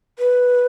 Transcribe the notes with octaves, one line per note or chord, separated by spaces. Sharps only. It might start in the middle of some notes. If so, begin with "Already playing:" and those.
B4